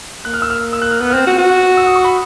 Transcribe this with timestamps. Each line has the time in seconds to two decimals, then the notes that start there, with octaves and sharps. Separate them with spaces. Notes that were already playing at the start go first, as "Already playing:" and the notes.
0.25 A#3 F#6
0.34 F6
0.42 E6
0.50 F6
0.73 E6
0.82 F#6
0.91 F6
1.01 B3 F#6
1.11 C4 F6
1.27 F#4
1.38 F#4
1.77 E6
1.86 D#6
1.96 C#6
2.04 B5